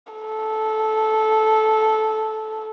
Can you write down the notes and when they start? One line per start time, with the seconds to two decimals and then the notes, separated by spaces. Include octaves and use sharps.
0.13 A4